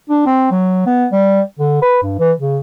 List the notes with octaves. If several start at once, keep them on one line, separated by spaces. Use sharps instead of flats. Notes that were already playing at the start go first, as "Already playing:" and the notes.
D4
C4
F#3
B3
G3
D3
B4
G2
E3
C#3